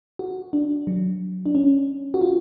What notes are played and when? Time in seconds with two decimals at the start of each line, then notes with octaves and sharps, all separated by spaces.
0.19 F#4
0.53 D4
0.87 F#3
1.46 D4
1.55 C#4
2.14 F#4
2.21 F4